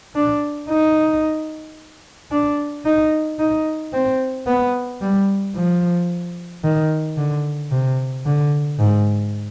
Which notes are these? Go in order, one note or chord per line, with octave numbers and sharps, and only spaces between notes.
D4
D#4
D4
D#4
D#4
C4
B3
G3
F3
D#3
D3
C3
D3
G#2